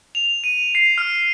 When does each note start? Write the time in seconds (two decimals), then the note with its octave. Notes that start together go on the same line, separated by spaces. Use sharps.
0.15 F7
0.44 D#7
0.75 C7
0.98 F6